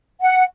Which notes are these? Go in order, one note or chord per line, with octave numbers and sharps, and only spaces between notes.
F#5